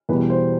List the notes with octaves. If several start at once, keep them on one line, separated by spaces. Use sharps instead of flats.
E2 B2 G3 B4
C5